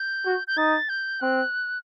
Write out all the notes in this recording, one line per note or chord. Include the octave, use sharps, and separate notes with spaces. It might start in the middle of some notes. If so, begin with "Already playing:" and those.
Already playing: G6
F#4
G6
D#4 A6
G6
C4 F#6